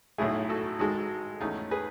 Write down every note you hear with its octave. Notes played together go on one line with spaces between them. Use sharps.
B1 A2 F#3 A3 E4 G#4
F#4 A4
G#2 D#3 G#3 F#4 A4
E2 D#3 A3 C#4 D#4
G#4 B4